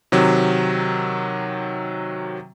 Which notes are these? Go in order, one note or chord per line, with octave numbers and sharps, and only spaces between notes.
C3 D#3 F#3